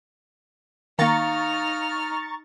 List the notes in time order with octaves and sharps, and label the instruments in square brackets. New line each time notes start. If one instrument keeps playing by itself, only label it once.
[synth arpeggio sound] D#3 A#3 [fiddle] D#4 F6 [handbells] F5 [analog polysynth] A#5 C#6 A6